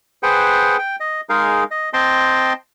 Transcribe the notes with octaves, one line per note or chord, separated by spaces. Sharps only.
G#4 B4 C5 F#5 G5
G5
D#5
G#3 D#4 G#4 A#4 F5
D#5
C4 D#5 G5 A5 C6